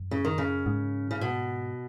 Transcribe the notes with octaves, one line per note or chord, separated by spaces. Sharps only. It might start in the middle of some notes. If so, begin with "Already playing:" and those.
Already playing: F#2
C#3
D#3
C#3
G#2
C#3
B2